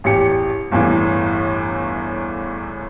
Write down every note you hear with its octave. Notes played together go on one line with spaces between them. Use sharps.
A1 E2 G4 C#7
G1 E2 A2 E3